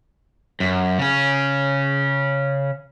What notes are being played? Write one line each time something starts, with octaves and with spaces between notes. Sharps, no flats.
F#2
C#3 C#4